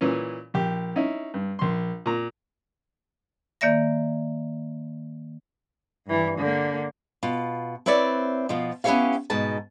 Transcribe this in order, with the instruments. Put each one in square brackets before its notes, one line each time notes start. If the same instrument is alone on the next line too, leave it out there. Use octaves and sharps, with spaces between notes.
[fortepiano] A#2 E3 C#4
A#1 G4
C#4 D#4 E4
G2
A#1 C6
A#2 A#5
[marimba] D#3 A#3 D5 E5 A#6
[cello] G2 E3
D3 A#3
[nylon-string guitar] B2 F4
C4 E4 B4 C#5 D5
B2 F3 F4
B3 C#4 E4 G4 C#5 F5
G#2 B2 A5